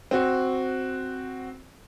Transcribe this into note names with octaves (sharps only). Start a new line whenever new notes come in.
C4 F#4